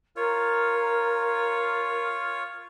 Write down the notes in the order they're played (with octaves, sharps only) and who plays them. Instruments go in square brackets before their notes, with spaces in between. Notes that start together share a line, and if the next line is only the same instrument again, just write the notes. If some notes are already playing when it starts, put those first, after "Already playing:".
[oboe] F4 [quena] A#4 [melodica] C#5